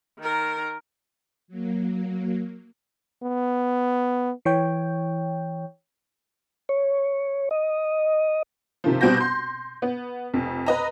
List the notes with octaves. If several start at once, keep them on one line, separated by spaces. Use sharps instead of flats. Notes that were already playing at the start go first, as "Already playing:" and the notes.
D#3 A#4
F#3 A#3
B3
E3 C#5 G5
C#5
D#5
C3 D#3 F3
B2 G3 C4 F#4 G6 A#6
C6 G6
B3
F1 F2
B4 D#5 A#5